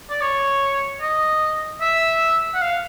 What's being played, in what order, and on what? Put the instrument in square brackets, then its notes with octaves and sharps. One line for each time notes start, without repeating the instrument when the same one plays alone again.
[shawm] D5
C#5
D#5
E5
F#5
F5